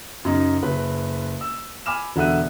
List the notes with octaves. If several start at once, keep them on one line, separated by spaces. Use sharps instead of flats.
F#2 C#3 D#4
F#1 B4
E6
G#5 B5 D6 F6 E7
E1 D3 F#4 E5 F#6 D#7